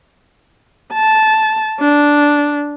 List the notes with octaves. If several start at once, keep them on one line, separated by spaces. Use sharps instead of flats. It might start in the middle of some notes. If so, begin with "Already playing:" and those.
A5
D4